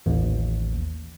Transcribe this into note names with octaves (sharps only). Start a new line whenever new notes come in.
A1 D#2